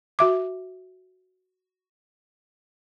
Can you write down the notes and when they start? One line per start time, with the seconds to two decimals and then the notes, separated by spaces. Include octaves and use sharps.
0.19 F#4 E5 D6